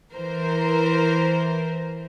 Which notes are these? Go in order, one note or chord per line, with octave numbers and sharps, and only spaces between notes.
E3 A#4 C5